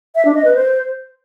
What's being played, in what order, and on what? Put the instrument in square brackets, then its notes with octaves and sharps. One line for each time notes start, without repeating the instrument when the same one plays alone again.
[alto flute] E5
D4
D#5
B4
C5